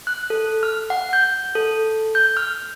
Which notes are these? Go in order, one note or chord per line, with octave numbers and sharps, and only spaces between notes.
F#6
A4
F6
F#5
G6
A4
G6
F6